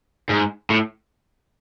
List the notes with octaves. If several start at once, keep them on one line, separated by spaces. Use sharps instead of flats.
G#2
A2